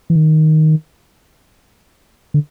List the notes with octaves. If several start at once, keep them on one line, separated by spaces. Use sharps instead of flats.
E3
D#3
D3